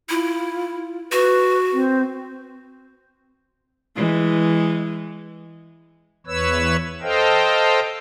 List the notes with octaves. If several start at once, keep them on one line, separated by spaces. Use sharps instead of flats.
E4 F4
F#4 B4
C4
E3 G#3
E2 B4 C#5 E6
A4 C5 D#5 F5 G5